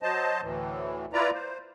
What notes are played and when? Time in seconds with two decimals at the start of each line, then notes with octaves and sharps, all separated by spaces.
0.03 F#3 C5 D#5 A5
0.42 D2 A2 E3
1.13 E4 F4 B4 D5 A#5
1.33 C5